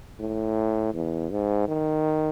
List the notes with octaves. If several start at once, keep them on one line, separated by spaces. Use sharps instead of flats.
A2
E2
G#2
D#3